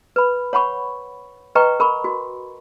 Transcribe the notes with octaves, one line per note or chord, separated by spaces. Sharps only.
B4 B5
C#5 F#5 B5 C#6
B4 D#5 G5 A#5 C#6
A#4 B5 C#6
F#4